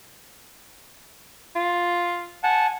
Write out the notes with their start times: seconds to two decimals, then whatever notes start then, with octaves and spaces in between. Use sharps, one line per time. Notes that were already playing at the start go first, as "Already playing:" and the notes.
1.56 F4
2.44 F#5 G#5 A5